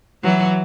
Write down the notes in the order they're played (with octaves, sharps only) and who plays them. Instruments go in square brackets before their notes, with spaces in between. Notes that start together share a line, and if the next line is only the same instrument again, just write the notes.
[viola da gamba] E3 F#3